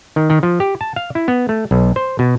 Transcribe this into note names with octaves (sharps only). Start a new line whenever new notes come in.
D#3
D#3
F3
G4
A5
F5
E4
B3
A3
B1
C5
B2